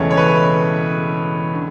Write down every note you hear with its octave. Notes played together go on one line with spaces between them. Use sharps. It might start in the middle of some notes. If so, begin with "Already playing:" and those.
Already playing: E1 E2 C#3 E3 A3 C#5
C#5
B4
D3